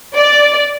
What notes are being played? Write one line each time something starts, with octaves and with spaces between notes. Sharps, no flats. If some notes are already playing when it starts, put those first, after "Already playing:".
D5